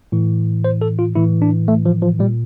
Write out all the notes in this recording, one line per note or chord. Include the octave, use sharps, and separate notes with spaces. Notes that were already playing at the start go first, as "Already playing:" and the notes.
A2 E3
C5
A4
F4
A2 E3 E4
D4
A3
F3
F3
A#2 G3